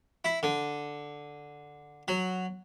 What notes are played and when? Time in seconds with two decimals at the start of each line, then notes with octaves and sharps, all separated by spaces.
0.25 E4
0.43 D3
2.08 F#3